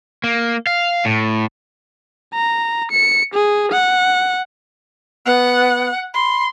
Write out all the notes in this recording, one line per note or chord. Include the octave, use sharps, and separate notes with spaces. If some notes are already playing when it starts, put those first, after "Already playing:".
A#3
F5
A2
A#5
C#7
G#4
F#5
B3 F#5
B5 C6